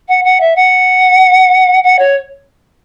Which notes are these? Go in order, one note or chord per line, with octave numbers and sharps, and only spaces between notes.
F#5
F#5
E5
F#5
F#5
C#5